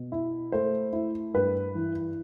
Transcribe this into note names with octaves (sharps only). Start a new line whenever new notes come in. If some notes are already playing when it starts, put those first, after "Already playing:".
Already playing: B2
E4
A3 C5
E4
G2 B4
E3